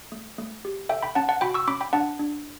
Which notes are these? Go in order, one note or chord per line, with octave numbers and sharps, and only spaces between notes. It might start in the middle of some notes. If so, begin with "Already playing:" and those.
A3
A3
G4
A4 E5 G5
G5 B5
C#4 F#5 A5
F#5 A5
F#4 G5 B5
C#6 E6
C#4 B5 D6
G5 B5
D4 F#5 A5
D4